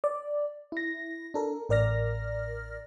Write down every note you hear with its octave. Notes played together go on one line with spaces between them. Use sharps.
D5
E4 A#6
D4 A4 A#4
A1 A#4 D5 F6 A#6